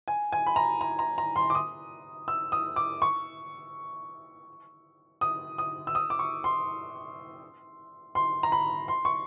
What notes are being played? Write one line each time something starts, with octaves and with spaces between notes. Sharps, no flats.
G#5
G#5
B5
A#5
A#5
A#5
A#5
C6
D6
D#6
E6
D#6
D6
C#6
D#6
D#6
E6
D#6
D6
C#6
C6
C6
A#5
B5
C6
C#6